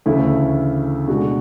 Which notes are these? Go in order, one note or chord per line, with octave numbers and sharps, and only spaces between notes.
D2 C#3 E3 A3 E4
B2 G#3 D4 F#4